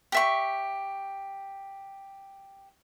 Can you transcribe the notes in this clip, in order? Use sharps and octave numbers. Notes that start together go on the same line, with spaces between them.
G4 E5 C#6